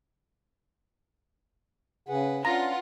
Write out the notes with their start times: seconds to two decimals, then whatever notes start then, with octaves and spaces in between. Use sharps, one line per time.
2.08 C#3 G#4 B4 F#5
2.45 C#4 D4 F4 B4 F#5 A#5